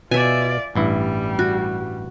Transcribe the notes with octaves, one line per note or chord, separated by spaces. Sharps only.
B2 F4 D5 E5 G#5
A1 G2 G3 E4
F#4